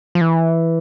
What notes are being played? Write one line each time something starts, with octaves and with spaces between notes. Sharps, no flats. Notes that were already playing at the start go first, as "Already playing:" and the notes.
F3
E3